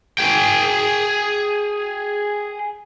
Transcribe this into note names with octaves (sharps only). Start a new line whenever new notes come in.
G#4 G5